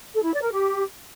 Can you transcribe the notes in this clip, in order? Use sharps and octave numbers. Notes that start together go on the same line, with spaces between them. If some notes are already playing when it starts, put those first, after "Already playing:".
A4
E4
D5
A#4
G4